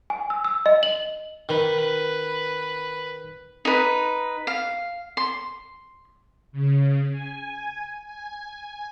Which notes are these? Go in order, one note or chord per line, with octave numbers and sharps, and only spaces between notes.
G#5
E6
E6
D#5
F#7
D#3 B4
D#4 B4
F5
C6
C#3
G#5
G#5